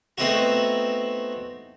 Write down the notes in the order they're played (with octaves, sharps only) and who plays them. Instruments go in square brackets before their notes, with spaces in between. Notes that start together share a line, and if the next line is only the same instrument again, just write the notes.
[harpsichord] A3 B3 C4 D#4 E4 F#4